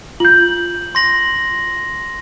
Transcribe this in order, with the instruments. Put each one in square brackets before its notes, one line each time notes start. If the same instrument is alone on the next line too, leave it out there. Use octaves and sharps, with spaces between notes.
[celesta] F4 G6 [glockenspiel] F#7
[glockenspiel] C6 A#6 F#7